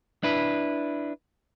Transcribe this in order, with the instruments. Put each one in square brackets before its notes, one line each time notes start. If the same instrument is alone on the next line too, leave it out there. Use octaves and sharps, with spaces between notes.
[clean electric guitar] D4 E4 B4